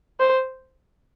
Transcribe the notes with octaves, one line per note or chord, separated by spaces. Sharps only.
C5